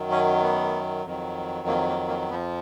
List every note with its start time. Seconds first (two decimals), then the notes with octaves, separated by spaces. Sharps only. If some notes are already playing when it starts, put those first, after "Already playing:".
Already playing: F#2 D#3 F#3
0.11 C#4
0.43 B3
1.05 F2 D#3 F#3
1.67 A#3
1.88 A#3
2.08 A#3
2.29 F2 F3 B3